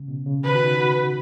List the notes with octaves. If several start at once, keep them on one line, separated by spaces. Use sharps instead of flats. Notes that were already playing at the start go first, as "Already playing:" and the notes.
Already playing: C#3
B2
C#3
D#3 B4
F#4
D#4
F#4